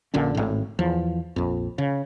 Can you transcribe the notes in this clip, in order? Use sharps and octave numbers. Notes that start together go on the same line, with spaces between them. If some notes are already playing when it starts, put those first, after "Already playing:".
A#1 A#2 D3 C#4
G#1 A2
E2 F3
A#1 F2
C#3